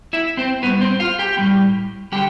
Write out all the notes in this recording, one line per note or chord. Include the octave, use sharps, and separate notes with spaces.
E4 E5
C4 C5
A2 G3 B3 B4
C4 C5
F4 F5
G4 G5
A2 G3 B3
D3 G3 G4 G5